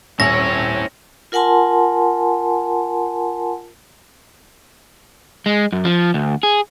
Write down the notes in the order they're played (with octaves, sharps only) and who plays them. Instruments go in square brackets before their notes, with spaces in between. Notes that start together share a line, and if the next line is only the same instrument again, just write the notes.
[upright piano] D#1 [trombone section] C4 C#4 [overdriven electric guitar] E4 C#5 [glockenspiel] A#6
[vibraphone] F4 A#4 F#5 G#5 A5 C6
[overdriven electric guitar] G#3
F#2
F3
D2
G#4